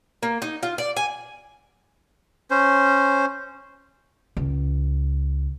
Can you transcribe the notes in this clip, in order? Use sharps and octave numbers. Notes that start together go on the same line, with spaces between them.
A#3
D#4
F4
D5
G#5
C#4 C5
C#2